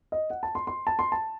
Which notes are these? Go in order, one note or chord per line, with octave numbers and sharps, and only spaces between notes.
D#5
F#5
A5
C6
C6
A5
C6
A5